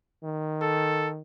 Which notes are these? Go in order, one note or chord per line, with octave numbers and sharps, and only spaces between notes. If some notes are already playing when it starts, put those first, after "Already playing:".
D#3
A4